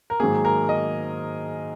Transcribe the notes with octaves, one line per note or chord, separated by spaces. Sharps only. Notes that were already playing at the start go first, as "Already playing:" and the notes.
A#4
G#2 D#3 F#3 A#3 G#4
A#4
D#5